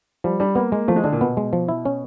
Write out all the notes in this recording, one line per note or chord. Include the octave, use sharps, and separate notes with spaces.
F3 G3
G3 D4
A#3 B3
G#3 A#3
F3 A3
G#3
D3 D4
A#2
B2 B3
G#3
F3
E4
C#4